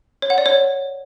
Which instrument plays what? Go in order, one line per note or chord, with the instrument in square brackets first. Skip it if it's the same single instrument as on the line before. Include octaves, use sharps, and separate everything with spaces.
[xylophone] C#5
F#5
D5
C#5